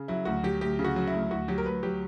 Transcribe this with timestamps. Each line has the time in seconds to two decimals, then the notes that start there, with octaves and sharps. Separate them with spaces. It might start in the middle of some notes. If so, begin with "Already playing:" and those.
Already playing: C#3
0.08 F#3 E4
0.25 D2 F#4
0.43 F#3 G4
0.61 D2 G4
0.79 C#3
0.84 F#4
0.96 F#3
1.08 E4
1.14 D2
1.31 D2 F#4
1.48 F#3 G4
1.58 A#4
1.66 D2 B4
1.83 F#3 G4